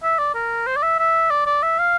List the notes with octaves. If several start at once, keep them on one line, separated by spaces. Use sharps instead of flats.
E5
D5
A#4
C5
D5
E5
E5
D5
D5
E5
F5